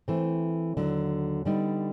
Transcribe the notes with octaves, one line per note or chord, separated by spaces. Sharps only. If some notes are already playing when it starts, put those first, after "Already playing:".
E3 A3 C4
D#2 D3 F#3
D3 G3 B3 D#4